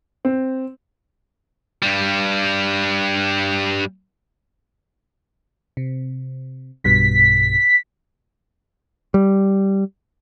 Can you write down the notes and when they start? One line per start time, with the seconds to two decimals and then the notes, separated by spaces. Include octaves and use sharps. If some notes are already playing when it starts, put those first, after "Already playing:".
0.25 C4
1.83 G2 G3
5.77 C3
6.84 B1 G2 B2 B6
9.14 G3